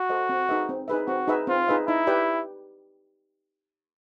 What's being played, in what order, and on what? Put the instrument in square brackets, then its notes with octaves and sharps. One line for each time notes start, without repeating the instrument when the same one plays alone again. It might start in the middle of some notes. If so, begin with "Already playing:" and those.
Already playing: [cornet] F#4
[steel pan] A4 C5 D#5
C4
D#4 G#4 B4 E5
C4
D#4 G#4 B4 E5
[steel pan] C4 [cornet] F#4
[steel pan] D#4 G#4 B4 E5
[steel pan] C4 [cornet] F4
[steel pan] D#4 G#4 B4 E5
[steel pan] D#4 [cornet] E4
[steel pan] G4 B4 D5 G5